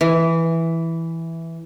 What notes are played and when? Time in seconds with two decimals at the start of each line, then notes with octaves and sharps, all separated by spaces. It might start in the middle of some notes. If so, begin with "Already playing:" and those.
0.01 E3